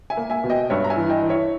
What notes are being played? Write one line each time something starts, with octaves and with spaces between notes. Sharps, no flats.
E5 G#5
A#3
E5 G#5
B2
D#5 G5
G2 C#5 E5
A#5
E5 G#5
E3
D#5 G5
E3
C#5 E5